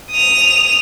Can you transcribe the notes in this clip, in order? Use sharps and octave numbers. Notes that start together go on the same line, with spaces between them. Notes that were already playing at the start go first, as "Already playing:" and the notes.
D#6 F7